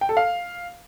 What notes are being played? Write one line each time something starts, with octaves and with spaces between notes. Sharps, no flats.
G5
A4
F5